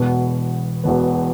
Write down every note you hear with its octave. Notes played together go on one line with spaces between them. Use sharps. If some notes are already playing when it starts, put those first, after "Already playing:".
Already playing: E1 E2 B2 B3
E1 E2 B2 B3